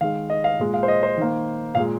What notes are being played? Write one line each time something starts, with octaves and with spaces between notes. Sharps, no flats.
D#3 G#3 F5
D#5
F5
A#2 G#3
F5
C5
D#5
C5
D#3 A#3
A#2 G#3 F5